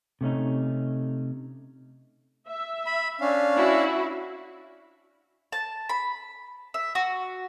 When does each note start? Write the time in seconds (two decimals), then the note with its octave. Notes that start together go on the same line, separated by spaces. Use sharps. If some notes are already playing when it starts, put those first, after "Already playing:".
0.21 C3 A3 C#4 D#4
2.48 E5
2.86 B5
3.21 C#4 D4 F5
3.55 E4 F#4
5.52 A5
5.89 B5
6.74 E5
6.95 F#4